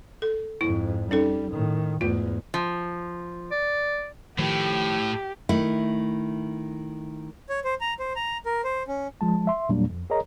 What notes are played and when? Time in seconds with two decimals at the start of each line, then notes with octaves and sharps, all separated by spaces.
0.22 A4
0.61 F2 G#2 E4
1.11 G3 C#4 D#4 A4
1.51 A2 D#3
2.01 E2 G#2 A3 F4
2.54 F3
3.51 D5
4.39 A2 D#3 F3 G4
5.49 D#3 A3 E4
7.49 C#5
7.64 C5
7.81 A#5
7.99 C5
8.16 A#5
8.46 A#4
8.64 C5
8.88 C#4
9.21 F3 G#3 A5
9.47 E5 C6
9.69 E2 A#2 F#3 G3 A#3 D4
9.90 F2
10.10 G#4 A#4 C#5 D#5 A#5